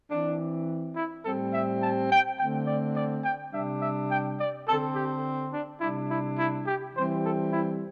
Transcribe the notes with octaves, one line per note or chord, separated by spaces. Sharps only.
E3 C4 D4
E4
A2 G3 C4 A4
E5
A5
G5
D3 A3 C4 G5
D5
D5
G5
C3 G3 D4 E5
E5
G5
D5
D3 C4 A4
G4
D4
C3 G3 D4 E4
E4
E4
G4
E3 G3 C4 C5
A4
E4